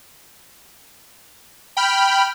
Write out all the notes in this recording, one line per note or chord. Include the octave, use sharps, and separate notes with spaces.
G5 B5 F6